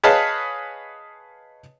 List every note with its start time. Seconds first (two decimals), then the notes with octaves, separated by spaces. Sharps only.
0.04 G#4 B4 C#5 D#5 F5 A5